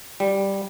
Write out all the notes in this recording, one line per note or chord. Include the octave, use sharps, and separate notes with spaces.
G3